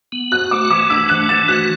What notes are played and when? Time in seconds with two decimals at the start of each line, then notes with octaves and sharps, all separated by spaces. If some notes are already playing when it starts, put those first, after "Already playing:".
0.12 B3
0.31 F#4 F#6
0.51 A3 D6
0.70 E3 D6
0.90 D4 E6
1.09 A3 F#6
1.29 E3 A6
1.48 F#4 F#6